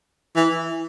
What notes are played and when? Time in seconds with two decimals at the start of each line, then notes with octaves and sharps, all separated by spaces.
0.36 E3